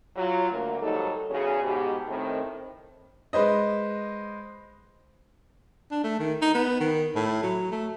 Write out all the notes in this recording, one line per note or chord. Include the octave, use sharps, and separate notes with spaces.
F#3 F4
D2 A#3
G#2 D#3 F#3 G3 D#4 A4
E2 C#3 C#4 F#4 G#4
G#2 B2 G4
A2 D#3 C4
G#3 B4 C5 D#5
D4
A3
D#3
D#4
B3
D#3
A2
F#3
A3